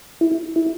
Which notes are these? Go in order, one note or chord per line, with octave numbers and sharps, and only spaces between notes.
E4
E4